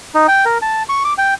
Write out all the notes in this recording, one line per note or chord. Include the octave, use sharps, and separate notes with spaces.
D#4
G5
A#4
A5
C#6
D6
G5